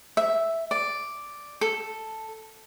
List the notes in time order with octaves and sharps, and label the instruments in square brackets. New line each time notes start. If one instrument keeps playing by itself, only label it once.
[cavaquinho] E5
D5
A4